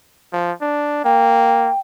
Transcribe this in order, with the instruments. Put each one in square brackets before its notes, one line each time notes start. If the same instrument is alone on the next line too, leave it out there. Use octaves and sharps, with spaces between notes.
[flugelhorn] F3
D4
[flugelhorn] A#3 [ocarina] G5